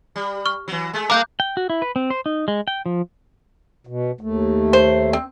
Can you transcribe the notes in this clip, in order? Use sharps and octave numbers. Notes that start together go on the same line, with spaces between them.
G3
C#6 F6
E3 F#3
G#3 A3
A#4 F5 D6 F#6 G6
G5
F#4
E4
B4
C4
C5
D#4
G#3
G5
F3
B2
D#2 A3
C5
C4